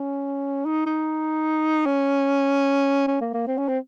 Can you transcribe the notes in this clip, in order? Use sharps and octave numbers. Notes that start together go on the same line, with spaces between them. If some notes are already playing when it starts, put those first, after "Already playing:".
Already playing: C#4
D#4
D#4
C#4
C#4
A#3
A#3
C4
C#4
C4